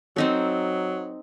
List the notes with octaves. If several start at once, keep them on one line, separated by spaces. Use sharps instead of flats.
F#3 C4 D#4 A4